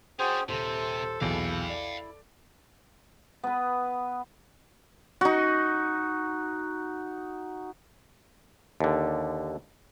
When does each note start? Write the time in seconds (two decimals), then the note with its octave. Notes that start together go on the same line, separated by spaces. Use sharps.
0.19 C#4 D4 F#4 G#4 C5 G5
0.49 D#1 C3 A4 C5
1.21 B1 E2 A#2 E4 F5 G5
1.69 D5
3.43 B3 B4
5.21 D#4 F#4
8.80 D#2 D3